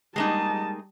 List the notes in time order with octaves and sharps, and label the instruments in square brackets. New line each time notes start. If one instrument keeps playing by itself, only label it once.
[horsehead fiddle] G3 A5 [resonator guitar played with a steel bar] G#3 A#3 D#4